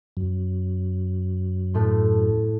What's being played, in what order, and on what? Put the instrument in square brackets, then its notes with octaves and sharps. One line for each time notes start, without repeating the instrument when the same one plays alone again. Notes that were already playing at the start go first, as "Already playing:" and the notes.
[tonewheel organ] F#2
[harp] A2 A3 C6